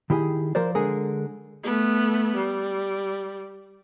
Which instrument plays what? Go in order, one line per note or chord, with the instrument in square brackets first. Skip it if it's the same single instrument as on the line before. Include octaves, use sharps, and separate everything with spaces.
[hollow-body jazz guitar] D#3 E4 G4 G#4
F3 A#4 C5 D5
D3 G#3 G#4 A#4
[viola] A3 B3
G3